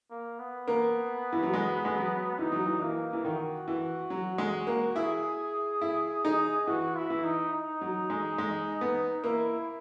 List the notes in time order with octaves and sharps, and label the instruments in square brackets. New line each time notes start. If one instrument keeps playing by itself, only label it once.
[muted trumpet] A#3
B3
[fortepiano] A#3
E3
F#3
G#3
G#3
F#3
[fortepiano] E3 [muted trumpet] D#4
[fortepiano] F#3
E3
[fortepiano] E3 [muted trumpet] A#3
[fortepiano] E3
[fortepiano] D#3 [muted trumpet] F#4
[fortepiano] E3
F#3
G#3
A#3
[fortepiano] E4 [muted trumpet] G#4
[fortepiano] E4
D#4
[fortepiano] E3 [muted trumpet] F#4
[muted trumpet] E4
[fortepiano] E3
[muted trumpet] D#4
D#4
[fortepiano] F#3
G#3
G#3
B3
[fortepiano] A#3 [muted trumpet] E4